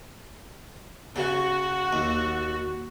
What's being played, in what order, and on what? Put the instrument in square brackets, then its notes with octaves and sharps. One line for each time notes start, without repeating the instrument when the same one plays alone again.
[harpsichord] C#3 [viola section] F#4
[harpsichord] D#2